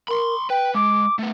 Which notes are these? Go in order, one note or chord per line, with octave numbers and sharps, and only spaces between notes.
A#4 B5 C6
B4 G5
G#3 D6
A3 B3